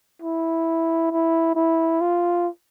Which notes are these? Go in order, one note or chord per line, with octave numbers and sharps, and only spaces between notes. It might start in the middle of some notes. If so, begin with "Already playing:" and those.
E4
E4
E4
F4